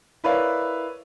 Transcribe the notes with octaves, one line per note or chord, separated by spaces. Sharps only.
E4 A#4 B4 C#5 D5 F5